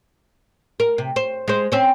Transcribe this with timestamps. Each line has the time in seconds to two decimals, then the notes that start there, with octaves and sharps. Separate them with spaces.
0.80 A#4
0.98 C3
1.16 C5
1.48 G#3 C5
1.72 C4 C#4